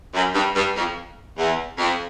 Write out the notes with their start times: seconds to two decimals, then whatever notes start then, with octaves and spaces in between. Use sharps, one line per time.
0.14 F#2
0.35 G2
0.55 G2
0.76 F2
1.37 E2
1.78 F2